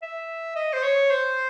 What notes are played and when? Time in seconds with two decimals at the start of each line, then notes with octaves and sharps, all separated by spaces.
0.02 E5
0.56 D#5
0.73 C5
0.83 C#5
1.10 C5